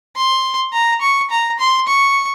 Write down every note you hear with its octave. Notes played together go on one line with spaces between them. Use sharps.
C6
A#5
C#6
A#5
C6
C#6